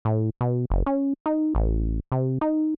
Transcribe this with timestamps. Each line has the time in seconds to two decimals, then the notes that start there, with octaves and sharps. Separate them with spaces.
0.05 A2
0.41 B2
0.70 F#1
0.86 C#4
1.26 D#4
1.55 A1
2.12 C3
2.41 D#4